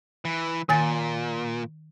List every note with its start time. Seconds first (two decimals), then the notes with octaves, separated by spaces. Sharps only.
0.25 E3
0.69 A#2 D#3 G#5 A6